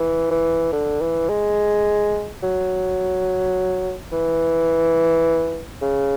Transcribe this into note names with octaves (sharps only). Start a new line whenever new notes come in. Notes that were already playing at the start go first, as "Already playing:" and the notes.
Already playing: E3
E3
D3
E3
G#3
F#3
E3
C#3